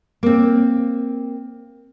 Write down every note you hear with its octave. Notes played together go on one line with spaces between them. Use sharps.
A#3 C4